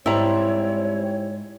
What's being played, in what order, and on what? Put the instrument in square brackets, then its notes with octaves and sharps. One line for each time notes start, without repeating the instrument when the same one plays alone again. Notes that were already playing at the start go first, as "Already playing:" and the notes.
[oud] G#2 [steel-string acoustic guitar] G3 C4 [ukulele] E4 A#5 [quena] C#5